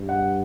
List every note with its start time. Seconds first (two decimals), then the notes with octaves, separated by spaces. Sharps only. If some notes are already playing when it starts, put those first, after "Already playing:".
Already playing: G2
0.09 F#5